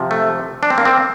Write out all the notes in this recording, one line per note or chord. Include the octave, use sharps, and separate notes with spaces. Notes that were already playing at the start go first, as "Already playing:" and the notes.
Already playing: C3 F3
A3
D4
C4
A#3
C4